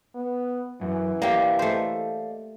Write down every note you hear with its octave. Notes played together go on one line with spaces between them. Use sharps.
B3
F#2 E3
A#3 G4 D5 D#5 F5
A3 C5